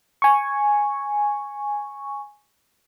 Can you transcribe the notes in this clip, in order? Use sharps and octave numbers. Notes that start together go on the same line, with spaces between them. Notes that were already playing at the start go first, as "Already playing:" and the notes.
G#5 C#6